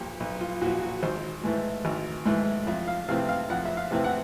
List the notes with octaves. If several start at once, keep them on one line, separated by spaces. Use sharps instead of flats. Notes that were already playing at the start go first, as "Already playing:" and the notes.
Already playing: B1 A#2 F3 G4
B1
F4
A#2 F3 F#4
F#4
G#1 C5
G#2 E3 A3
G#1
G#2 E3 A3
F2 E5
F5
C3 E3 A3 C4 F5
F5
F2 F#5
E5
F5
C3 E3 A3 C4
F#5